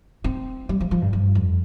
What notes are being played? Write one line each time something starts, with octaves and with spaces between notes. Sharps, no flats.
C4
G3
F3
F3
G2
G2
F2